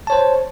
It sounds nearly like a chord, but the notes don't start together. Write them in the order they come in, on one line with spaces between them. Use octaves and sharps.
A5 C#5 C5